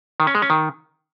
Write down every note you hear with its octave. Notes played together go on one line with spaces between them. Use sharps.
D#3
C#4
G#3
C#4
D#3